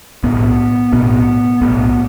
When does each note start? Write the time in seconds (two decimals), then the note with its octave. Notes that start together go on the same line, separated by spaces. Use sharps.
0.23 B1 A2 B3
0.93 B1 A2 B3
1.61 B1 A2 B3